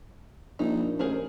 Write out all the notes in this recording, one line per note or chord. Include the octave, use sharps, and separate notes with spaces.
A#1 D#4 E4
A1 G#4 A#4 C5